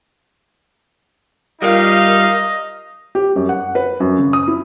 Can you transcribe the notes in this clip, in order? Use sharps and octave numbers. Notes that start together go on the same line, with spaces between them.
G3 D#4 F4 A#4 D#5 F5
G4
F#2
F#5
B4
F#2
C#3
D#6
E4